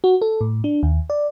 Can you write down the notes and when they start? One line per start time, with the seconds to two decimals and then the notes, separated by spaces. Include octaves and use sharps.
0.04 F#4
0.22 A4
0.41 A2
0.64 D4
0.83 D#2
1.10 D5